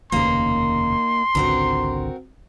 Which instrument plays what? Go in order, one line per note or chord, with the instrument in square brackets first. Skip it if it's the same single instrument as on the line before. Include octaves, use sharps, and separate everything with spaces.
[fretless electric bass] F1 D#2 C#3 [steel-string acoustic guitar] A#3 D#4 [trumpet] C6
[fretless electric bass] G#1 C#2 D3 [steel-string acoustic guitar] C4 F#4 A#4